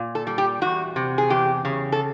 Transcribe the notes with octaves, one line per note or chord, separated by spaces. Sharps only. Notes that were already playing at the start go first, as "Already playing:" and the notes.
Already playing: A#2
A4
G3
G4
E2 F#4
C3
G#4
E2 G4
C#3
A4